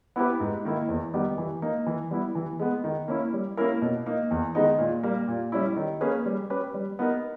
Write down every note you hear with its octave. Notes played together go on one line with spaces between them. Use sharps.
B3 E4 G4 B4
G#2
D#3 A#3 E4
E2
D#3 G3 B3 G4
E3
A#3 D#4
E3
G3 B3 E4
E3
G#3 B3
D#3
A#3 C#4 E4
G3
A#3 C#4 E4 A#4
B2
A#3 D#4
E2
D#3 G#3 B3 D#4
A#2
G3 A#3
A#2
G3 C#4 E4
D#3
A#3 C#4 G#4 B4
G3
C#4 G4 B4
G3
B3 D#4 A#4